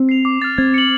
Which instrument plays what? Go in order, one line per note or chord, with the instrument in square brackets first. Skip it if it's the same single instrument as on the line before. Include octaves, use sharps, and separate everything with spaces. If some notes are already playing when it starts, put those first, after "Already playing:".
Already playing: [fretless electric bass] C4
[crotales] C7 F7
D6
F6 A6
[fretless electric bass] C4 [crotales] G#6
[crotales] C#7 F#7